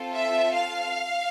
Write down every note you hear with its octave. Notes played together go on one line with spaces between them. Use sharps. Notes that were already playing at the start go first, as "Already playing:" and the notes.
Already playing: C4 F4 A4
E5
F5